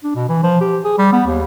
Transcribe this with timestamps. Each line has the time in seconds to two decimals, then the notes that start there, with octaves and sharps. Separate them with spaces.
0.04 D4
0.15 B2
0.29 E3
0.43 F3
0.61 G4
0.84 G#4
0.98 G3
1.13 B3
1.27 D#2